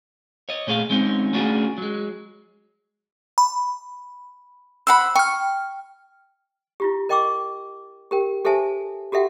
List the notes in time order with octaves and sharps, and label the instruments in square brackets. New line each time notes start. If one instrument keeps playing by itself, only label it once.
[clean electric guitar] C#5 D#5
A#2 A3 G#4 B4 F5
G#3 C4 C#4 D#4
A3 C#4 D4 F4 F#4 G#4
F#3 G#3
[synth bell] B5
[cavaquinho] C5 F#5 B5 [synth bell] E6
[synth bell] G5 F6 [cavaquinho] C#6
[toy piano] E4 F4 G4
A#4 D#5 G5 C#6 D6 E6
G4 A#4 G5
G4 A4 C5 E5 G#5 A5
F#4 G4 A4 E5 F#5 G5